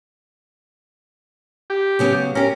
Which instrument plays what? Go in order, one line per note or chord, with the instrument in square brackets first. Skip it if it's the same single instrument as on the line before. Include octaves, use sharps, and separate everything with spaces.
[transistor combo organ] G4
[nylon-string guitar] C#3 F#3 B3
[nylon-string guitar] C#4 G4 [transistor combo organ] A#4